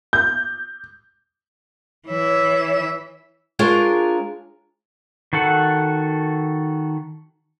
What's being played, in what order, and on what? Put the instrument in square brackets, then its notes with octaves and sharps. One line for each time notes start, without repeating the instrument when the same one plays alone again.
[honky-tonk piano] G6
[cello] E3 E5 [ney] C#5
[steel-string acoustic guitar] G#3 D4 F4 G#4 A#4 C#5
[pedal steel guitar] D#3 F#4 A4 F#5